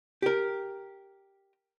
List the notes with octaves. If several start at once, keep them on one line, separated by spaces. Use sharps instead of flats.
G4 A#4